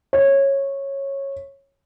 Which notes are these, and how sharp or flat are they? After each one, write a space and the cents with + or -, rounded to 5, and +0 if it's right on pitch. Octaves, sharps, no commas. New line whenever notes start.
C#5 -15